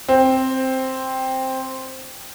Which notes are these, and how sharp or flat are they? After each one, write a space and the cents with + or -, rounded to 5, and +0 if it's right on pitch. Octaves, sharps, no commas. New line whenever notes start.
C4 +5